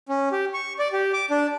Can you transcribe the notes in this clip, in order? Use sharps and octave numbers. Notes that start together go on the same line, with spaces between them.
C#4
G4
C#6
D5
G4
D6
D4